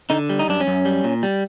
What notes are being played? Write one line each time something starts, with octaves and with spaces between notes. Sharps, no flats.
D3 D#4
G3
D#4
F#2 D4
C#4
F#2
G3
A#2
G3